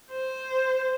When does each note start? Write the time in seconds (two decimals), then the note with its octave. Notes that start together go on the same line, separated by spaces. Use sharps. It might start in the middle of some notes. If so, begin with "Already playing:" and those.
0.10 C5